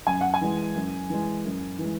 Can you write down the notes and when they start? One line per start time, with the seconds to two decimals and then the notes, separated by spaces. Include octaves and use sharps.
0.07 F#2 G#5
0.21 F#5
0.34 G#5
0.41 E3 G#3
0.76 F#2
1.10 E3 G#3
1.45 F#2
1.79 E3
1.84 G#3